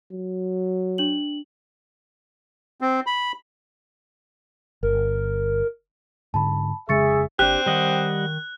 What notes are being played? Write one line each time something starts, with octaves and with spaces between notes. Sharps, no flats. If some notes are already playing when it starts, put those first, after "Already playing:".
F#3
D4 F#7
C4
B5
G1 A#4
G#2 D3 A5 B5
F1 C#3 G#3 G#4 E5 C#6 A6 C#7
F#1 C4 D4 G4 F#6
D#3 G3 D#5 F#5